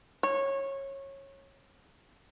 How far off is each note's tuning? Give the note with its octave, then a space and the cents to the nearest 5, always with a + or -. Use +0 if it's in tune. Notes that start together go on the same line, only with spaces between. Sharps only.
C#5 -20